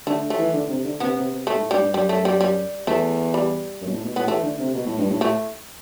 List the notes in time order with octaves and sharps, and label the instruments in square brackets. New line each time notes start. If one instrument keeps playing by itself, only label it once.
[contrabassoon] D3 [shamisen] A3
[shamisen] A3
[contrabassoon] E3
D3
C3
D3
[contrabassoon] C3 [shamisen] B3
[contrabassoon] C3
C3
[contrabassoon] B2 [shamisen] A3
[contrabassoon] G2
A2
[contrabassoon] G2 [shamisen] G3
[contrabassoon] A2
G2
[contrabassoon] F#2 [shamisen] G3
[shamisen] A3
G3
G3
[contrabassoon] E2 [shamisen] A3
[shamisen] G3
[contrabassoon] F#2
B2
A2
B2
[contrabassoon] A2 [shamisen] B3
[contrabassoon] E3 [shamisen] A3
[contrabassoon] D3
C3
B2
A2
G2
A2
[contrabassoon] A2 [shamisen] A3